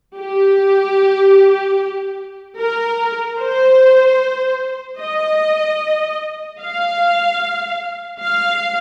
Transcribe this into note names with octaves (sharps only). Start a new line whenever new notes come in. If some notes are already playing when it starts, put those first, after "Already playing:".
G4
A#4
C5
D#5
F5
F5